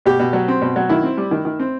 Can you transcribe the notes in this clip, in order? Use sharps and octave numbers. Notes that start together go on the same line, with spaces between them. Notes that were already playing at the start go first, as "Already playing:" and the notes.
B2 G4
B2
F#3
C4
B2
F#3
D#3 E4
C4
G3
D#3
D#3
C4